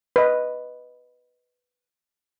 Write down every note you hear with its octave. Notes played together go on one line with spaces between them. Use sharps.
B4 D#5